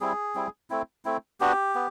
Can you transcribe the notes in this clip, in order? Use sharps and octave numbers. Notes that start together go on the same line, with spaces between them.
G3 C4 E4 G#4
G3 C4 E4
A3 C4 E4
A3 C4 E4
B3 D4 F#4 G4
B3